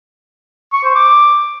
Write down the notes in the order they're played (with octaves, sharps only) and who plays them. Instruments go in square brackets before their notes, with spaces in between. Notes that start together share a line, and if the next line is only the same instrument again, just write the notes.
[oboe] C#6
C5
D6